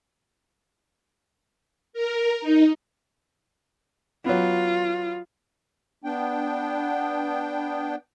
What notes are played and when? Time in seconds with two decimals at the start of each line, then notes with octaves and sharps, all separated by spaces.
1.93 A#4
2.41 D#4
4.26 F#3 B3 F4
6.04 B3 D4 G5